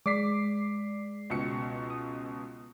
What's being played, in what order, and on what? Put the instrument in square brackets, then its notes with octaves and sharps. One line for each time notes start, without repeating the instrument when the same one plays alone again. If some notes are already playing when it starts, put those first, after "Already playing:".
[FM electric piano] G#3 D5 C7 [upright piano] D6 B6
[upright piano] C#2 B2 C#7
[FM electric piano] D#6